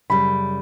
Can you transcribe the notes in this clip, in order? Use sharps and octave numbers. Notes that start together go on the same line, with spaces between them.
F#2 C#3 G3 B5